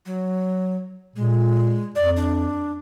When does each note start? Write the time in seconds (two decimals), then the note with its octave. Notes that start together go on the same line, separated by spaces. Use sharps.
0.06 F#3
1.16 A#2 G#3
1.96 F2 D5
2.17 D4